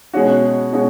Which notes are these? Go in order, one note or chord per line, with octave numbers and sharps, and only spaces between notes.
B2 G#3 C#4 F#4
B2 G#3 C#4 F#4